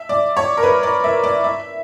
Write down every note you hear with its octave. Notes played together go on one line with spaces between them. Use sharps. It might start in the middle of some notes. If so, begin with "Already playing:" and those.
Already playing: E5
D5
C#5
A#4
B4
D5
E5
D5
E5